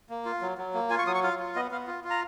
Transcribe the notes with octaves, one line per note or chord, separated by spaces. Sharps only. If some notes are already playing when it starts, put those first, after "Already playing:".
A#3
F4
F#3
F#3
A#3
F4 G#5
C#6
F#3 D#6
C#6
F4 F5
F4
B3 D#5
B3 F5
F4
F4
A#5